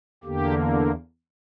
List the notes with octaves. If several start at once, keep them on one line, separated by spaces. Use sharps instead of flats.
E2 D3 A#3 G4